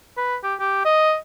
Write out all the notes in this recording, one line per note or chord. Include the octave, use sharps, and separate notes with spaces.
B4
G4
G4
D#5